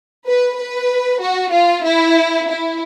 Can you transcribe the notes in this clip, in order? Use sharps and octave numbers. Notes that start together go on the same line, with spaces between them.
B4
B4
F#4
F4
E4
E4